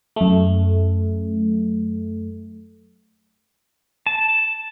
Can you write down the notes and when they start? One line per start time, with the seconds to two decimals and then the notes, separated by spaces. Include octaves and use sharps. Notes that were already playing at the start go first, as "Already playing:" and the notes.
0.16 F#2 A3
4.07 A5